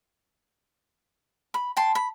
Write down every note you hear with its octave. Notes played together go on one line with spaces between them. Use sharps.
B5
G5 A5 C6
B5